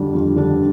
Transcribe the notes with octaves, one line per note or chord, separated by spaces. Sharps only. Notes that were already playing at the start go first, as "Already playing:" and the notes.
Already playing: F2 D3 G3 D4
F2
D3 G3 D4